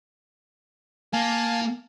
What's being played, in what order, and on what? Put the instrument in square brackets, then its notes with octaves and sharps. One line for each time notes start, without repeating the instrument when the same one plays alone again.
[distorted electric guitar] A#3 [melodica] F5 G#5 A5